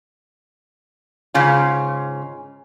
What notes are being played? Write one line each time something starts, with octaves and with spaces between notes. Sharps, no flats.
G#2 C#3 C#4 F4